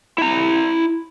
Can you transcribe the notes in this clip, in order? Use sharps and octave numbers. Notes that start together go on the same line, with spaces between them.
E4 A#5